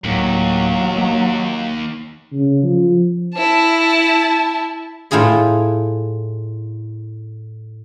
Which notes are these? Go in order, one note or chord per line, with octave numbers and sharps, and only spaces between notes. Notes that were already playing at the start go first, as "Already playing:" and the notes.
D1 D#2 A2 F#3 A#3
A#3
C#3
F3
E4 A5
A2 E4 F4 G#4 C6